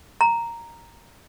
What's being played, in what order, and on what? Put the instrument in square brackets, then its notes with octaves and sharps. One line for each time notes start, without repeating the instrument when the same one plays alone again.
[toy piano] A#5